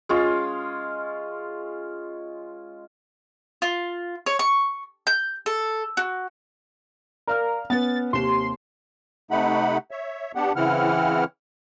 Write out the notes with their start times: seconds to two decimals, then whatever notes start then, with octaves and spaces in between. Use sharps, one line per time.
0.09 G#3 C#4 F4
3.62 F4
4.26 C#5
4.39 C#6
5.07 G6
5.46 A4
5.97 F#4
7.27 A#4 D5 F5 F6
7.70 B3 C#4 B4 A6
8.13 D#2 C3 C6 E7
9.31 C3 A3 D#4 F#5 B5
9.91 C#5 E5
10.35 B3 D4 G4 F#5
10.56 C#3 E3 C4 E4 F#5 F6